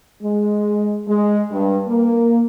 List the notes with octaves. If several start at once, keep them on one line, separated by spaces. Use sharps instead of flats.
G#3
G#3
G2
A#3